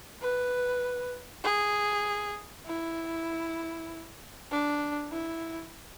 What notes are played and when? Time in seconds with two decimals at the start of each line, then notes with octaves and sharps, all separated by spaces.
0.21 B4
1.44 G#4
2.66 E4
4.51 D4
5.11 E4